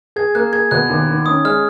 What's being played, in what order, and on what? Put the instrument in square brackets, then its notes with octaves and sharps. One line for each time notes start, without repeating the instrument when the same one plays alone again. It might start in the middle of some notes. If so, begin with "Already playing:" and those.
[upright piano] G#4 [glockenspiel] G#6
[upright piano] A#3 [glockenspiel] F#6
[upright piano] G#4 [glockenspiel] G#6
[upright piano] B2 [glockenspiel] F#6
[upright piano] D#2
D#3
[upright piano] C#4 [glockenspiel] D#6
[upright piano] G#3 [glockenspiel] F6